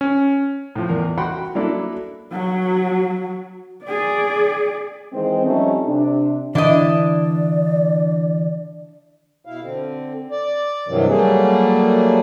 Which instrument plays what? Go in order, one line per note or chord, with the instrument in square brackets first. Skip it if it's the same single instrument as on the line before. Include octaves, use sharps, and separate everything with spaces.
[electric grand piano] C#4
[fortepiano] A2 F3
E2 A#4
F#4 F#5 G5 B5 C6
F#3 A#3 D4 E4 A4
[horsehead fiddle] F#3 F#4
G#4 D5
[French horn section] D#3 E3 G#3 C4
F3 G3 A3 C4 C#4 D#4
C3 D4
[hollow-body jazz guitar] D3 E3 [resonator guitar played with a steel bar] D4 E4 D#5 [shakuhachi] D5
[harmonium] B2 E4 F5
D3 C4
D5
G2 C3 D#3 E3 F#3
F#3 G3 A3 A#3 G#4